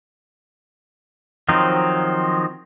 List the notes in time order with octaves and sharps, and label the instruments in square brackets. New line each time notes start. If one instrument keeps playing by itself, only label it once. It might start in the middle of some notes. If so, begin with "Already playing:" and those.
[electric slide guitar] D#3 F3 F#3 C4 D#4